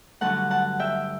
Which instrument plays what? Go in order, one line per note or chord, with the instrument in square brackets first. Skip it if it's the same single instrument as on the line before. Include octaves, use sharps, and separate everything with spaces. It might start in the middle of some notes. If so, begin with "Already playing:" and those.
[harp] G2 D3 F#3 A3 F#5 A5
F#5 A5
E5 G5